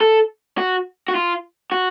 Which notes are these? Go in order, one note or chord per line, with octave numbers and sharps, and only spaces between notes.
A4
F#4
F#4
F4
F#4